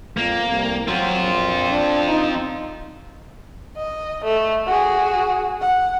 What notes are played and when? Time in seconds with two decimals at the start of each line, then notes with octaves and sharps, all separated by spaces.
0.17 F2 A#3
0.51 C2
0.88 F#3 C4 F4
1.24 A#1
1.70 D4
2.08 D#4
3.77 D#5
4.24 A3
4.66 F#4 G#4
5.61 F#5